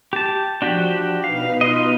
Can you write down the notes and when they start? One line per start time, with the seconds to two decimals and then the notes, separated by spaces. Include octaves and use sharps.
0.13 G4 A5
0.62 F3 D4 F#4 G4
1.24 B2 D#4 B4 F5
1.61 F4 D#5